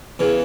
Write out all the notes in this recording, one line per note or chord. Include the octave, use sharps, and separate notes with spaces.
E2 C#3 E3